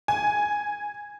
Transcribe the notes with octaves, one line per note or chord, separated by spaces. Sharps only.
G#5